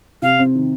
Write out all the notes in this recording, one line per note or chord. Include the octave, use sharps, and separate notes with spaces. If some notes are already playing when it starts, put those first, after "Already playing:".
C3 F5
C4
D#3